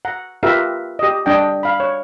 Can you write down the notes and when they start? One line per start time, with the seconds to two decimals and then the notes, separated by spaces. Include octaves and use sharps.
0.05 F#5 A#5
0.43 F4 G4 A#4 B4 E5 F5
0.99 G4 D#5
1.26 G3 D4 D#5 G5
1.63 F5 B5
1.80 C#5